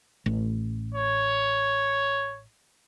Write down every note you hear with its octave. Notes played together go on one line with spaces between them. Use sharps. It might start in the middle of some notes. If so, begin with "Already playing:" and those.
A1
C#5